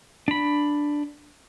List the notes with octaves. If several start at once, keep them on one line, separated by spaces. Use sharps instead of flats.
D4 B5